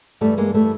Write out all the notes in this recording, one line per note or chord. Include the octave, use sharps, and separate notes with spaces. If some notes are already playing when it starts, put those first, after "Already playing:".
G2 E3 G3 A3
G#3 A#3
G3 A3